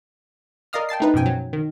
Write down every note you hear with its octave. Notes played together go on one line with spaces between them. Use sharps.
A#4 D5 D#5 F5 D#6 F6
G5 A5 A6 C7
A3 D#4 B4
F#2 B2 F3 G5 G#5
F#3
D#3